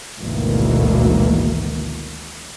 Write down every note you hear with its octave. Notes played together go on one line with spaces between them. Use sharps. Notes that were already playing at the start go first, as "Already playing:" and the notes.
G#1 D2 B2 D#3 E3 A#3